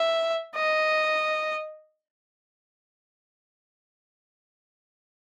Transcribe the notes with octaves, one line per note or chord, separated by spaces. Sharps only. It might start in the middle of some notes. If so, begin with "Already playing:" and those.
Already playing: E5
D#5